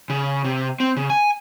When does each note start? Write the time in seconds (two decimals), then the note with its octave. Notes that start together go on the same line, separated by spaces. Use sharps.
0.10 C#3
0.44 C3
0.80 C4
0.97 C#3
1.10 G#5